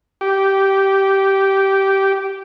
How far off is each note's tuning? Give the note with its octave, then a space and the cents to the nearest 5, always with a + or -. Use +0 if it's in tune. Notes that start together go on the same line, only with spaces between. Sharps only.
G4 -10